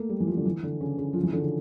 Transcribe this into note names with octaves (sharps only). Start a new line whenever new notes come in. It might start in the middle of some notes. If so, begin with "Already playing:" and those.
Already playing: A3 A#3
G3
E3
F3
D3
E3
D3
C#3
C#3
F3
E3
D3
C#3